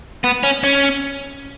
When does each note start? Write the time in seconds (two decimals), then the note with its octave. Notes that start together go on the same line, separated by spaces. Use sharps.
0.24 B3
0.43 C#4
0.64 C#4